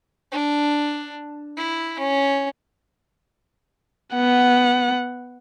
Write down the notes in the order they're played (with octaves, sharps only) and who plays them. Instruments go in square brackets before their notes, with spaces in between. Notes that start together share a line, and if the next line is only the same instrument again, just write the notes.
[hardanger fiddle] D4
E4
C#4
[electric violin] B3 F#5